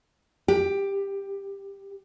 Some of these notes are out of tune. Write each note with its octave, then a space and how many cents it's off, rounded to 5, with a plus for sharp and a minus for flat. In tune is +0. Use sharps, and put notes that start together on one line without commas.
G4 +15